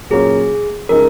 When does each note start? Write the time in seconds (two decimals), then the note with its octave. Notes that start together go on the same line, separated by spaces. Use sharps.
0.10 A#2 F#3 A#3 C#4 F4 G#4
0.89 C#3 F3 G#3 D#4 G#4 A#4